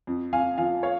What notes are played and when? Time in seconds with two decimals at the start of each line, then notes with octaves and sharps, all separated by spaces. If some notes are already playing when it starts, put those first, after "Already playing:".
0.07 F2
0.33 F2 F5 G#5
0.57 F3 F5 G#5
0.83 C#5 F5